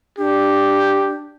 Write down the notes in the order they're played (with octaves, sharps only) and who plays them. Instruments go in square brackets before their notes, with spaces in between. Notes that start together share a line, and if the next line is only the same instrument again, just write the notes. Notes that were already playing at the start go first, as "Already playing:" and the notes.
[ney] D4 [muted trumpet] G4